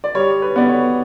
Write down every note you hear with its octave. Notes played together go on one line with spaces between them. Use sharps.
D5
G3 C#5
B4
B3 D5
C#5